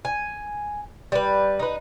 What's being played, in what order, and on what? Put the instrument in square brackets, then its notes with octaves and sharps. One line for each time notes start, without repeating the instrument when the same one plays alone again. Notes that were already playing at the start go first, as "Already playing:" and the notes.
[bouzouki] G#5
G3 B4
D#4 B4